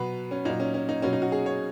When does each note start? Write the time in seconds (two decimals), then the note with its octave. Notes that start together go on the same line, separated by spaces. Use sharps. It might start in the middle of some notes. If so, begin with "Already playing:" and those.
Already playing: B2 F#3 B4
0.31 C#4
0.45 A#2 F#3 D#4
0.60 C#4
0.74 C#4
0.89 D#4
1.02 B2 F#3 C#4
1.13 D#4
1.22 F#4
1.32 G#4
1.46 C#5